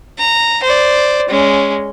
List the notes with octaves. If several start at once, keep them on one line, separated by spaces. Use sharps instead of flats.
A#5
C5 D5
G#3 C#4